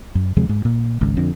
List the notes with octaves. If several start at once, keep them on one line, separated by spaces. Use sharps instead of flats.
F#2
D#2 C3 F3 G#3
G#2
A#2
G#1 C#2
F2 D3